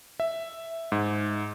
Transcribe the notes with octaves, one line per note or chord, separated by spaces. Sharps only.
E5
G#2